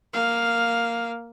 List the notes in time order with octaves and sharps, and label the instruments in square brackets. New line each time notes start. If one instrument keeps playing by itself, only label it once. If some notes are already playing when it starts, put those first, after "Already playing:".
[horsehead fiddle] A#3 F5